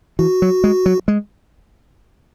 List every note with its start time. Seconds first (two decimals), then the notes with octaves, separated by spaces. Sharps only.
0.19 E3 F#4
0.42 F#3
0.64 G#3
0.86 F#3
1.08 G#3